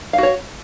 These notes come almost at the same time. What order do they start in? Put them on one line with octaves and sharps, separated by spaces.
F5 F#4 C#5